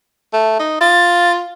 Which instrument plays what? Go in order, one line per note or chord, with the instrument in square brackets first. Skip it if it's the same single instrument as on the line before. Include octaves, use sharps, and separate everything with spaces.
[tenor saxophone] A3
D#4
[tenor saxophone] F4 [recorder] A6